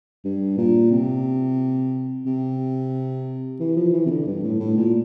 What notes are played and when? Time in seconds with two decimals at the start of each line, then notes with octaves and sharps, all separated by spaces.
0.24 G2
0.58 A#2
0.91 C3
2.26 C3
3.60 E3
3.76 F3
3.93 E3
4.06 C3
4.10 D3
4.27 G2
4.43 A2
4.60 A2
4.78 A#2